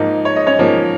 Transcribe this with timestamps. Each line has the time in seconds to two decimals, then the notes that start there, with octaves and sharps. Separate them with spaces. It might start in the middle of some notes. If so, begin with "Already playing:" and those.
Already playing: G#2 F3 A#3 D#4 D#5
0.25 C#5
0.36 D#5
0.46 C#4 C#5
0.59 G#2 F3 A#3